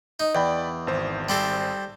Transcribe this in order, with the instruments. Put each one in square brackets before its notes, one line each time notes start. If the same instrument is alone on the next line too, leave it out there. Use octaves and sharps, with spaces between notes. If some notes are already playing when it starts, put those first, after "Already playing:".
[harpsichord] D#4
[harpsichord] E2 [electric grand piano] D5 G5 B5
[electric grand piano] G#1 C5
[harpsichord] G3 C4 A4